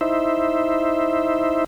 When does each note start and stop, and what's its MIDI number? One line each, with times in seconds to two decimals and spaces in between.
0.01 1.64 63
0.01 1.64 64
0.01 1.64 72
0.01 1.64 76